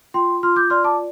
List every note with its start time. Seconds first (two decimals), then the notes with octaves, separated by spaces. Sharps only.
0.14 F4 G5 C6
0.43 F4 C6 F6
0.56 D6 G6
0.70 D5 C6 F6
0.84 A5 D6